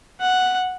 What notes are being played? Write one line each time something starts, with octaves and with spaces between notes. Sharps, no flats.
F#5